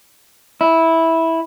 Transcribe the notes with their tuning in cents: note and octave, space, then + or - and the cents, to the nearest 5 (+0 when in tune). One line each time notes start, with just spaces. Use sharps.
E4 -10